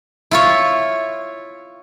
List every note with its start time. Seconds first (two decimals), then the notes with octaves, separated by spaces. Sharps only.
0.31 E4 F4 C#5